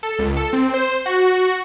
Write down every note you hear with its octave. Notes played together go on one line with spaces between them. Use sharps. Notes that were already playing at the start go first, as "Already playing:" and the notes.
A4
C#2
A4
C4
C5
F#4